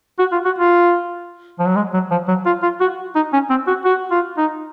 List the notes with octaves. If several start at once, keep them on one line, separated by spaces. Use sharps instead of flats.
F#4
F4
F#4
F4
F3
F#3
G#3
F#3
F3
F#3
F4
F4
F#4
D#4
C#4
C4
F#4
F#4
F4
D#4